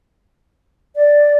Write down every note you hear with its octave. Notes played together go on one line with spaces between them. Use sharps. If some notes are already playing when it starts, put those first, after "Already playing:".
D5